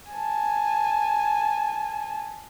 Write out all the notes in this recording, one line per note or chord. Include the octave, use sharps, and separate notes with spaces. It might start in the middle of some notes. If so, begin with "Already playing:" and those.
G#5 A5